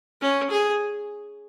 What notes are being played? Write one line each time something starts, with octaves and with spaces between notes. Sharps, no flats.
C#4
G#4